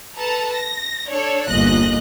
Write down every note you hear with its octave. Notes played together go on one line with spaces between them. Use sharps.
A4 B4 A5 A#5
A#6
D4 A4 C#5 D5
G1 E2 A#2 D#5 F#6 A#6